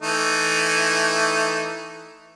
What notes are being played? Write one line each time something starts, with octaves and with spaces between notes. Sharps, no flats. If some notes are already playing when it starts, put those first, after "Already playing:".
E3 A3 D#4